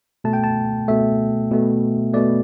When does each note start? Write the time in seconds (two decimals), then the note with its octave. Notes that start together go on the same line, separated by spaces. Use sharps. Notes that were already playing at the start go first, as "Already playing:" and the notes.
0.24 B2 A3 A5
0.33 G5
0.44 A5
0.88 B2 A3 E5
1.51 B2 A3
2.14 B2 A3 D5